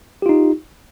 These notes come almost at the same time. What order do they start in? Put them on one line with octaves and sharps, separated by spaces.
G4 F4 D#4